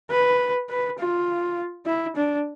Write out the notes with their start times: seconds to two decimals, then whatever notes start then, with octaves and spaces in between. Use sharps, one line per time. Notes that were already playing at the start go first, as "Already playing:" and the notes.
0.10 B4
0.69 B4
0.99 F4
1.86 E4
2.16 D4